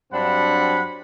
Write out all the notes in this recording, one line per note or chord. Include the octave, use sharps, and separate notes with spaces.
G2 F#3 C4 D4 F#5 B5